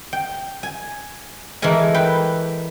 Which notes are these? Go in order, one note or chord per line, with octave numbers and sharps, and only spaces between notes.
G5
G#5
E3 G#3 A4 A#4 G#5
B4 G5